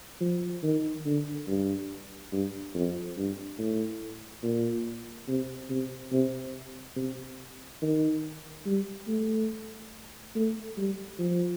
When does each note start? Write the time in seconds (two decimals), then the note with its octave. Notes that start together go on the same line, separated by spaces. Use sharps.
0.21 F3
0.63 D#3
1.05 D3
1.48 G2
2.33 G2
2.75 F2
3.17 G2
3.59 A2
4.43 A#2
5.28 C3
5.70 C3
6.12 C3
6.96 C3
7.82 D#3
8.66 G3
9.08 A3
10.35 A3
10.78 G3
11.19 F3